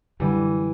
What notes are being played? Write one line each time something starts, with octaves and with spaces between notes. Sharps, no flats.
F#2 D3 E3 G3